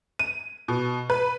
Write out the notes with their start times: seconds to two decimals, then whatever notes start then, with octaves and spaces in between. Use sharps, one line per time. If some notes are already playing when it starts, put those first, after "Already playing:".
0.19 D#7
0.68 B2
1.10 B4